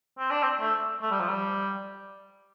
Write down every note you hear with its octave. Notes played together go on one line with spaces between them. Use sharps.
C4
D4
C4
A3
A3
G3
F3
G3